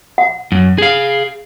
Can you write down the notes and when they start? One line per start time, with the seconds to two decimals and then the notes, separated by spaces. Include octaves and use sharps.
0.18 F#5
0.52 F#2
0.78 G#4 F5